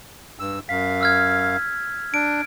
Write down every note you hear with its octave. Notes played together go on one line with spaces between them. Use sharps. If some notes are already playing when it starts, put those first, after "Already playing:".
G2 E6
F#2 F5 B6
E6 F6 G#6
D4 D7